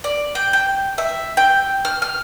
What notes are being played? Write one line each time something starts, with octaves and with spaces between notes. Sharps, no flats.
D5
G5
G5
E5
G5
F6
F6